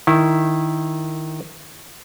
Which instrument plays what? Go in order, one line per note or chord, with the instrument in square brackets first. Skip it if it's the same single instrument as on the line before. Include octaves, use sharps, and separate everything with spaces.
[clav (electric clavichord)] D#3 E4